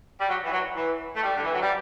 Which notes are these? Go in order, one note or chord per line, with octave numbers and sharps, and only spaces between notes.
G3
F#3
E3
F#3
E3
A3
G3
D3
E3
F#3
G3